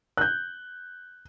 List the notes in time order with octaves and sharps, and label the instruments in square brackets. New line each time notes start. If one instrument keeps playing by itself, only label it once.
[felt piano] F#6 G6